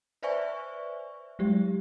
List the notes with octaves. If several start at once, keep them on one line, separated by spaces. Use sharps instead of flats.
B4 C5 D5 E5 G#5 C#6
F#3 G#3 G4